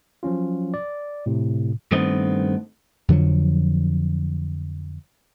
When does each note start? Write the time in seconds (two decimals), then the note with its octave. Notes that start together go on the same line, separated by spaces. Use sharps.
0.23 F3 F#3 C#4 F4
0.74 D5
1.26 A2 C3
1.92 G2 D#3 A3 B3 C4 D#5
3.08 F2 D3 F3 F#3